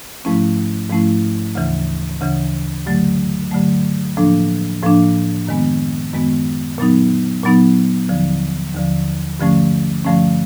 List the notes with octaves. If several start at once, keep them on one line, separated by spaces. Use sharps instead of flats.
G#2 F3 A3 C#4 E4
G#2 F3 A3 C#4 E4
D2 C#3 E3
D2 C#3 E3
G2 D3 F#3 A3
G2 D3 F#3 A3
A2 F3 A#3 D4
A2 F3 A#3 D4
F#2 D#3 G#3 B3
F#2 D#3 G#3 B3
A#2 F#3 B3 D#4
A#2 F#3 B3 D#4
D#2 D3 F3
D#2 D3 F3
G2 D3 F3 A3 C#4
G2 D3 F3 A3 C#4